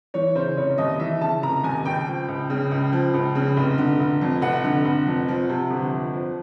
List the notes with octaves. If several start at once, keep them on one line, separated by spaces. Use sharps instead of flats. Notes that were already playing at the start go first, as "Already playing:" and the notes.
E3 C#5
C#3 C5
F1 C#5
D#2 D#5
E3 E5
C#3 A5
F1 A#5
D#2 G#5
C#2 G5
F3
C#2
C#3
C#2
F3
C#2
C#3
F1
D3
F1
F2
F1 F#5
D3
F1
F2
F3
C3
G1
F2
F3